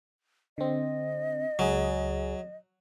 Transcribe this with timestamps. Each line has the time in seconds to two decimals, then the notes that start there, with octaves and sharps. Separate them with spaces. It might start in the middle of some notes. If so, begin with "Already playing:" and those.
0.58 D3 C4 D#5
1.59 C#2 F#3 G#4